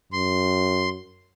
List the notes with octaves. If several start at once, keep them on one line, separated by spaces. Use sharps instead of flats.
F#2 C6